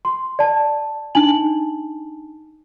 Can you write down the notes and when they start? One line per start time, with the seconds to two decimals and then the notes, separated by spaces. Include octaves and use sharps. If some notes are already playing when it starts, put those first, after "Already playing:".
0.05 C6
0.39 D5 A5
1.15 D4 D#4 G#5 A5 F#7